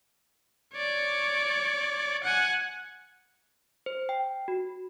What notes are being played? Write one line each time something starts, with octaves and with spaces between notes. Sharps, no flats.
C#5 D5
F#5 G#5
C5
G5
F#4